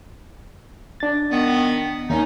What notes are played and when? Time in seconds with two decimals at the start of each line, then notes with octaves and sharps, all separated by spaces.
1.00 D4 A6
1.31 D#3 B3
2.10 D#2 C#4 D#4